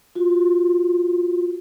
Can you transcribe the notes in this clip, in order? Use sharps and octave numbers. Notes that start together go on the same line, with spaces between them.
F4 F#4